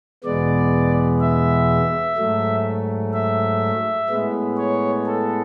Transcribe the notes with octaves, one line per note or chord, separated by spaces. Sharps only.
E2 B2 G#3 B3 D5
E5
G#2 F#3 A3
E5
A2 G#3 B3
C#5
A4